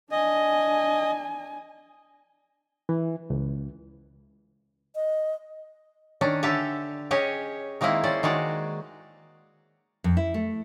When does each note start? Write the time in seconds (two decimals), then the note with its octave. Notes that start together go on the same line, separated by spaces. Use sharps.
0.12 D4 D#5 G#5
2.89 E3
3.30 C#2
4.95 D#5
6.21 D#3 C#4 D4
6.43 D3 G4 E5 A5 A#5
7.11 C#4 G4 G#4 C#5 D#5 G#5
7.81 D#3 G#3 A#3 C4 E4
8.04 C#4 C5 D5
8.23 D#3 G#3 F#4 D5
10.04 F2
10.17 E4
10.34 A3